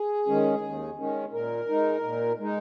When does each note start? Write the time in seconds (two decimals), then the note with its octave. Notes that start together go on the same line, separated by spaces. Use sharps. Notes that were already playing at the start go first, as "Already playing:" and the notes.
Already playing: G#4
0.26 D#3 G#3 C#4
0.62 D#2
0.97 D#3 G#3 C#4
1.32 A#2 A#4
1.69 G#3 D#4
2.04 A#2
2.39 G#3 D#4